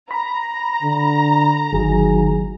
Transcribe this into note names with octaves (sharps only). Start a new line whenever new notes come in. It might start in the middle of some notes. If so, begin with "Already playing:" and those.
A#5 B5
D3
G1 D#3 F#3 G#4